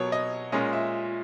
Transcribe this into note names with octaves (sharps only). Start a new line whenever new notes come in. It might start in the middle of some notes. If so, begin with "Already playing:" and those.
Already playing: B2 F#3 B3 A#4 C#5
D#5
A#2 G#3 C#4 D#5
E5